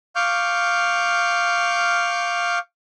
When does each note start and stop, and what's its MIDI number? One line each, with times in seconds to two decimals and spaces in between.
0.16 2.59 77
0.16 2.59 85
0.16 2.59 86
0.16 2.59 89
0.16 2.59 91